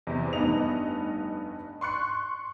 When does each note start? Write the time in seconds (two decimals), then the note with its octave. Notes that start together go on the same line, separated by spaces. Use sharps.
0.07 E2 C3
0.33 F1 G2 B3 D#4 D#5 F7
1.81 C6 C#6 F#6 C#7